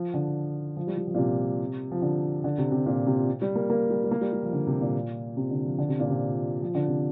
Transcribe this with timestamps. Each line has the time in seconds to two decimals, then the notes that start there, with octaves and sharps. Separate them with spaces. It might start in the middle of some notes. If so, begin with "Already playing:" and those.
Already playing: F3
0.14 D3
0.77 F3
0.87 G3
0.97 G3
1.08 F3
1.14 A#2
1.18 C3
1.91 F3
2.02 D3
2.44 D3
2.58 C3
2.72 C3
2.86 A#2
3.07 C3
3.42 G3
3.55 A#3
3.70 A#3
3.90 G3
4.04 G3
4.11 A#3
4.21 G3
4.33 G3
4.43 F3
4.53 D3
4.67 C3
4.81 A#2
5.37 C3
5.50 D3
5.65 F3
5.79 D3
5.88 C3
6.00 A#2
6.10 C3
6.62 F3
6.75 D3
6.88 C3